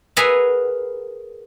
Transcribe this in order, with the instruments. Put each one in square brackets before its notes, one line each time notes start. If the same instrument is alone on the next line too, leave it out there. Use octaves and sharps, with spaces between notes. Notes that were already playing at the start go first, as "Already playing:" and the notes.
[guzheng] G#4 A#4 B4 E5 F#5